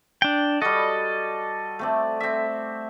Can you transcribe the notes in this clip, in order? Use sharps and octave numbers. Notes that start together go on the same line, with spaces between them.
D4 G5
G3 F#4 A4 D#5
A3 C4 D5
C4 E5